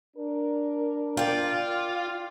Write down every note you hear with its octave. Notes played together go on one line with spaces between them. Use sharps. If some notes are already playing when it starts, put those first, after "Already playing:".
D4 A#4
F4 D5 G5